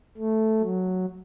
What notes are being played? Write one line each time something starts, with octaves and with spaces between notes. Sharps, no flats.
A3
F#3